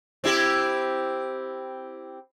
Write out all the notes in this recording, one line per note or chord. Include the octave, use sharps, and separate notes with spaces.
C4 E4 G4